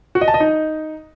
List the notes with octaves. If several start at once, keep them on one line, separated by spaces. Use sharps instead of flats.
F#4
D#5
A5
D#5
D#4